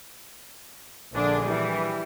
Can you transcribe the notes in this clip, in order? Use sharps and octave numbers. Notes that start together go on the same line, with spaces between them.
A#1 D3 D4 G#4
E3 G3